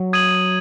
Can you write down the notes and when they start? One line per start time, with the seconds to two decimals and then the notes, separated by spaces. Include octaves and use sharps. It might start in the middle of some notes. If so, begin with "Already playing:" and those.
Already playing: F#3
0.13 D#6 G#6 D#7 F#7